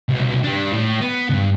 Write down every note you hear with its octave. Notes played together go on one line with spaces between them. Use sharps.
C2 B2
G3 D4
A2
B3
D2 G2